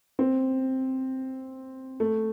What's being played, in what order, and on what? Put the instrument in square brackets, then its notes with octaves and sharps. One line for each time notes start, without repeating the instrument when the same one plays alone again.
[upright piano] C4
A3